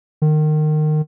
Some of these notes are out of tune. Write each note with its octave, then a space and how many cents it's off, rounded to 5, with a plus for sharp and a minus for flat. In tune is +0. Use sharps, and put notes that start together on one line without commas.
D#3 -25